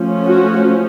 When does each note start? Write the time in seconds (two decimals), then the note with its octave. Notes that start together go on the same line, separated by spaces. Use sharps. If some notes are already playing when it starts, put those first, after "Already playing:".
Already playing: F3 A3 C#4
0.25 F#4